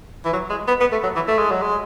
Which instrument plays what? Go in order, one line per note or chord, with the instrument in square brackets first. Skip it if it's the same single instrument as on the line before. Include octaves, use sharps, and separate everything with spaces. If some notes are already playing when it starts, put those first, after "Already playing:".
[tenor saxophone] E3
F#3
G#3
B3
B3
A3
F#3
E3
A3
G#3
F#3
G#3